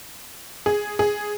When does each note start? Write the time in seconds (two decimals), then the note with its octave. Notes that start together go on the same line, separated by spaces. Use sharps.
0.66 G#4
0.99 G#4